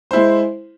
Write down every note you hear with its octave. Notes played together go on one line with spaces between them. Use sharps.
G#3 E4 C5